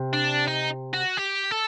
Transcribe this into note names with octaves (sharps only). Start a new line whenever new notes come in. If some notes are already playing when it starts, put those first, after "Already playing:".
Already playing: C3
D4
D#4
F#4
G4
A4